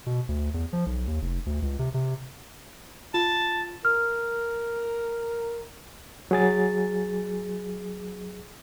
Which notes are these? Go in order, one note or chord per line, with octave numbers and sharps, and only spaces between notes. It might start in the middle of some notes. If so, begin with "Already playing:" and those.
B2
D2
E2
F3
B1
D#2
F1
D2
C#2
C3
C3
F4 A5
A#4 F6
F#3 G#4 A6